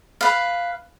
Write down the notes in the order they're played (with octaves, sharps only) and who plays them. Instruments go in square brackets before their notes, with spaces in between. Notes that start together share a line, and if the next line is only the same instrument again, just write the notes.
[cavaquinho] B4 F5